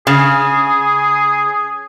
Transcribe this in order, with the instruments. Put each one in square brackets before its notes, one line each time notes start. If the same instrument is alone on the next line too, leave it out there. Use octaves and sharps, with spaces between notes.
[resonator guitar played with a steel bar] C#3 [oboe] G#4